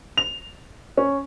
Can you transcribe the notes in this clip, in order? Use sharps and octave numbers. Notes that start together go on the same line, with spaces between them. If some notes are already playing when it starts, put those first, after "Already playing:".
F7
C#4